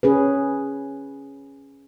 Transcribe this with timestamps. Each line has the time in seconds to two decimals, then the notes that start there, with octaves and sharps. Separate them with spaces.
0.03 C#4 G#4 B4